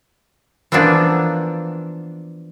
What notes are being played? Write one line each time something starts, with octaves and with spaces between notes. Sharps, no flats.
E3 F3 A#3 B3 D4